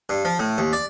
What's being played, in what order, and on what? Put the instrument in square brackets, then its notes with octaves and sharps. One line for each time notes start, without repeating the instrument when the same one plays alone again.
[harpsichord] G2
F3
A2
D#2
D5